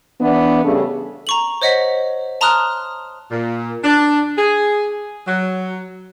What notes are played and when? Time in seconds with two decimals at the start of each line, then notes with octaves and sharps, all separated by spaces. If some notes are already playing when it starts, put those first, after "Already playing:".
0.21 E3 B3 D4
0.65 G2 C#3 A3
1.27 A#5 C#6 F#7
1.62 C5 C#5 D#5 F#5 B6
2.41 A5 A#5 C6 D#6 F6 F#6
3.31 A#2
3.84 D4
4.38 G#4
5.28 F#3